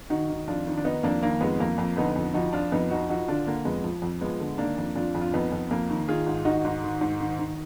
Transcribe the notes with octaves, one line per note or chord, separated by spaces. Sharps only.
D#3 D#4 F#4
D#3
F2 D4 F4
D#3
D4
D#3 B3 D#4
F2 A#3 D4
D#3 A#3
F2 G#3 B3
F2 A#3
F2
D3 B3 D#4
F2
F3 D#4 F#4
F3 D4 F4
F2 B3 D#4
F3 D#4 F#4
F3 D#4 F#4
D3 D4 F4
D3 A#3
F2 G#3 B3
F3
F2
F3 G#3 B3
D3
D#3 A#3 D4
F2
F2 D4 F4
F2
F4
F2 B3 D#4
F2
F2 A#3
D#3
D#3 F4 G#4
G#2
D#3 D#4 F#4
G#2
D#3
G#2
D#3
D#3